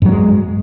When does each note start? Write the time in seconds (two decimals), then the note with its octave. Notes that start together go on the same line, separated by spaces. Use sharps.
0.02 G2
0.05 F#3
0.08 B3
0.12 G#3